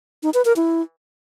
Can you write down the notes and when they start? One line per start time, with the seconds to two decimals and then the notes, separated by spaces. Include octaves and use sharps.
0.23 D#4
0.34 B4
0.45 A#4
0.56 E4